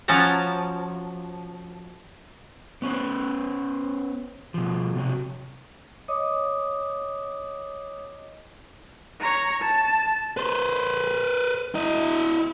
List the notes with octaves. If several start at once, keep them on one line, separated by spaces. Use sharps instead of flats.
F3 F#3 C#4 A5 A#5
B3 C#4 B4 C5
B2 F3
C3 F#3
C#5 D#5 D6 D#6
C#5 A#5
A5
B4 C5
E4 D#5